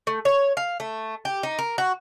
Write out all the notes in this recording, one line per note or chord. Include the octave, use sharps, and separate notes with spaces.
A3
C#5
F5
A3
G4
D#4
A#4
F#4